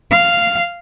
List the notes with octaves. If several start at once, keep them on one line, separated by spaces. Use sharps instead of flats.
F5